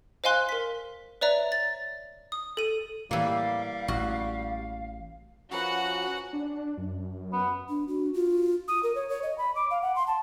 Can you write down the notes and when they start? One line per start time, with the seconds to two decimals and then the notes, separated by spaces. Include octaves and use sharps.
0.24 C5 D#5 F5 G#5 C6 F#6
0.49 A#4 B6
1.21 B4 C#5 D5 E5 A#5
1.52 A6
2.32 D#6
2.57 A4 D#7
3.11 A2 E3 G3 A#3 F5
3.88 A1 F#4
5.51 F3 C#4 F#4 G#4 A#4 B4 F#5
6.33 D4
6.78 F#2
7.32 B3
7.69 D4
7.88 D4 F#4
8.14 F4
8.68 D#6
8.83 A#4
8.95 C#5
9.09 C#5
9.23 D#5
9.38 B5
9.55 D6
9.71 F5
9.82 F#5
9.96 C6
10.07 A5